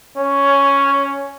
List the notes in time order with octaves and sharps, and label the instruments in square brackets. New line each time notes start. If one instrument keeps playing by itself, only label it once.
[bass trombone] C#4